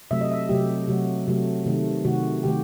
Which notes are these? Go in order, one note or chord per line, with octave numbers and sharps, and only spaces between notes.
C3 F#3 A3 E5
D#5
E5
C3 F#3 A3 G4
C3 F#3 A3 F#4
C3 F#3 A3
C3 D#3 A3
C3 D#3 A3 F#4
C3 D#3 A3 G4